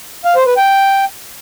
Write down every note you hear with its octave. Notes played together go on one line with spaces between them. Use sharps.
F5
C5
B4
G5